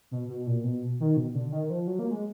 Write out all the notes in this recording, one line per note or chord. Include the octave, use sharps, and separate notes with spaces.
B2
B2
A#2
B2
D#3
B2
D3
D#3
F3
F#3
A#3
G#3